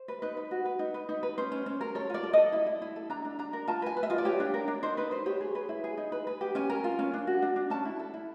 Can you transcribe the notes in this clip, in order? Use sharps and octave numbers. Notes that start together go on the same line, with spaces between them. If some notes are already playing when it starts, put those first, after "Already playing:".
Already playing: C5
B4
D#4 B4
B4
F#4
B4
D#4
B4
D#4
B4
C#4 C5
C#4
C#4
A#4
A4 C#5
F4 D5
A4
A4 D#5
E4
E4
E4
A4
D4 A#5
D4
D4 A#5
A#4
F4 A5
B4 G#5
B4
E5
F4 D#5
D5
G4 C#5
D4
A#4
D4
D#4 C5
D#4 B4
B4 C5
G4 C#5
G#4
B4
E4
G#4
D#4
B4
B4
G4
C#4 G#5
A#4
F4
C#4
D4
F#4
D4
D4
C#4 A5
E4
A4
E4